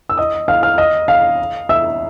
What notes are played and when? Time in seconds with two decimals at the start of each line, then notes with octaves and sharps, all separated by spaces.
0.09 E6
0.17 D#5 D#6
0.48 F5 F6
0.63 F5 F6
0.78 D#5 D#6
1.08 F5 F6
1.69 E5 E6